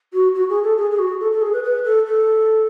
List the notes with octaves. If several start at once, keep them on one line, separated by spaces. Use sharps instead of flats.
F#4
F#4
G#4
A4
G#4
G#4
F#4
A4
A4
G#4
B4
B4
A4
A4